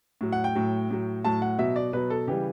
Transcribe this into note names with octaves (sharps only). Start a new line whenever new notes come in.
A2 F#3
F#5
G5
A2 F#3
A2 F#3
A2 F#3 A5
F#5
B2 F#3 E5
D5
B2 F#3 B4
A4
C#3 E3 G3 G4